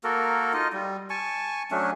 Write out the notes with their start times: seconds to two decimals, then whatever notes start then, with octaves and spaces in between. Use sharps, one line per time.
0.04 A#3 F#4 A4 A#4
0.53 D#4 F4 D#5
0.73 G3
1.10 G#5 A5 C#6
1.71 F#3 A3 C#4 D4